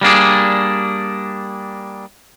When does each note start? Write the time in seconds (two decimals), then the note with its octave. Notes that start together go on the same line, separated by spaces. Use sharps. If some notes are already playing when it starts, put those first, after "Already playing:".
0.01 G3 A#3 D4 G#4